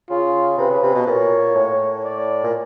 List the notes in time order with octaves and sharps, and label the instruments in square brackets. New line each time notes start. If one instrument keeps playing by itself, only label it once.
[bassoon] C#3 [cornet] F4
[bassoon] C3 [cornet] B4
[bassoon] C#3
C3
B2
[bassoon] A#2 [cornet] C#5
[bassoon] A2
[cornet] D5
[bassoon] A#2